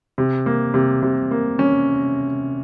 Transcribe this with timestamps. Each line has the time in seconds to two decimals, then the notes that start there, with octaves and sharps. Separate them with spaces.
0.18 C3
0.46 A#3
0.74 C3
1.02 C3
1.31 A#3
1.59 C#4